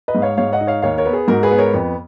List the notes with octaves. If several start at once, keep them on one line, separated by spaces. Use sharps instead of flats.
B4 D#5
G#2
C#5 F5
G#2 C#5 F5
D#5 F#5
D#4
C#5 F5
D#2 C#5 F5
A#4 C#5
B3
G#4
G#2 F#4 A#4
G#4 B4
B3
A#4 C#5
F2